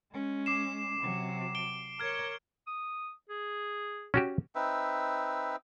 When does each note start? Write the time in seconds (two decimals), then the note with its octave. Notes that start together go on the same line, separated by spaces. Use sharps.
0.12 G#3 C#4
0.46 D6 C7 E7
1.00 C3 F#3
1.55 D7 G7
2.00 A#4 C#5 F6 G#6
2.67 D#6
3.29 G#4
4.14 C#4 F#4 G4
4.55 C4 D#4 B4 E5